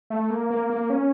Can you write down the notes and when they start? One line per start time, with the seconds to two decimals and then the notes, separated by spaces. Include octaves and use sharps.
0.10 A3
0.30 A#3
0.50 A#3
0.70 A#3
0.90 C#4